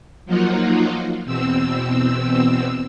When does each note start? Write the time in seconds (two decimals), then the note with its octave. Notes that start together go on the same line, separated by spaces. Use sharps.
0.26 F3 F#3 A#3 D#4 F4 F#4
1.25 E2 B2 C4 E6